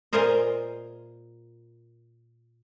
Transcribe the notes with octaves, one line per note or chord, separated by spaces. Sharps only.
A#2 F4 G#4 A#4 C5 D#5